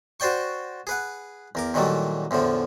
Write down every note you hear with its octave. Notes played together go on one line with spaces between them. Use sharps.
F#4 C5 D5 G5 C#6
G#4 B4 F#5
E2 A#4 D6
A#2 D#3 E3 F#3 G3 A3
E2 A2 D3 F3